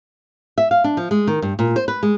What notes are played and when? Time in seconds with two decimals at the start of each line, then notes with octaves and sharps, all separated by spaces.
0.58 E5
0.71 F5
0.84 D4
0.97 F3
1.11 G#3
1.27 D#3
1.42 G2
1.59 A#2
1.76 C5
1.88 B4
2.03 G#3